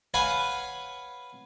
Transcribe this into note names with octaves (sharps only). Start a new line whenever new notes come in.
B4 C#5 F5 F#5 G#5 B5